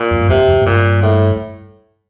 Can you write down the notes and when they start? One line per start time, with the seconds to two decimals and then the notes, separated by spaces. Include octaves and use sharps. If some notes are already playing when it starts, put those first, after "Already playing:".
Already playing: A#2
0.11 F2
0.21 G2
0.29 F2 C3
0.48 F2
0.62 A2
0.66 G2 A#2
1.02 A2